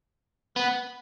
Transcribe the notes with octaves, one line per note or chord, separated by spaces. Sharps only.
B3